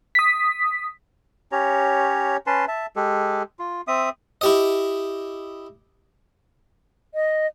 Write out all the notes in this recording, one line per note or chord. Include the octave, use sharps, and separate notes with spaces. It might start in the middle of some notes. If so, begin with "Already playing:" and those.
D#6 B6
C#4 G4 C#5 A#5
C#4 B4 A5 C6
E5 A5
G#3 G4 A4
F4
C4 E5 D#6
E4 G4 D#5
D#5